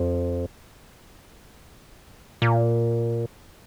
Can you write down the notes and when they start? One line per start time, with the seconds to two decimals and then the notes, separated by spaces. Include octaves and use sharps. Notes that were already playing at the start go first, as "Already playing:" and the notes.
Already playing: F2
2.42 A#2